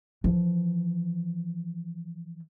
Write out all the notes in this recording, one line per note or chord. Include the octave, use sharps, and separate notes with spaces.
E3 F3